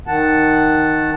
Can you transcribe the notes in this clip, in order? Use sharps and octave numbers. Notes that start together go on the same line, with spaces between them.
D#3 F#5 A5